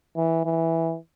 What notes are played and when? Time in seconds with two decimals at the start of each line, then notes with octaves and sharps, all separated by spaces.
0.17 E3
0.45 E3